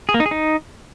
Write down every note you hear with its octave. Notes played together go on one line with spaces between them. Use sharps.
G#4
A#3
D#4
G#4
D#4